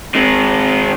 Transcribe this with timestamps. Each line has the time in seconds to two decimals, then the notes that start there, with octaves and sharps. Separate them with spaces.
0.15 D#3 G#3 C4